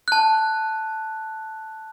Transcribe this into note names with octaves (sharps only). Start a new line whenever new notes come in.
A5 F#6